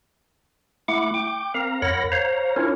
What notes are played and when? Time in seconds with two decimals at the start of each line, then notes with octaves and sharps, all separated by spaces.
0.88 A3 E4 F#5 D6
1.14 G5 D6
1.54 C4 A#4 F5 A#5
1.82 F2 A#4 C#5 F#5 B5 A#6
2.12 C5 C#5 F5 A#5
2.56 C#4 D4 E4 F4 A#4 C#5